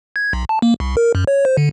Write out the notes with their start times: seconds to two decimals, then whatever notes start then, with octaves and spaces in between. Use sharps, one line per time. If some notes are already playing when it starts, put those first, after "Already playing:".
0.16 G#6
0.33 B1
0.49 A5
0.62 A#3
0.80 C2
0.97 A#4
1.15 F#2
1.27 C#5
1.45 C5
1.57 D3